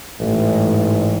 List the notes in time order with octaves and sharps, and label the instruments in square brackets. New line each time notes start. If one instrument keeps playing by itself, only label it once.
[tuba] A1 [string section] G#2